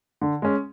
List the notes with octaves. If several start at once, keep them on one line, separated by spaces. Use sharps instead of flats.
D3
G#3 C#4